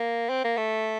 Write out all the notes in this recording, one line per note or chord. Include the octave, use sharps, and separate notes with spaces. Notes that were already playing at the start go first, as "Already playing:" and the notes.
Already playing: A#3
C4
A#3
A3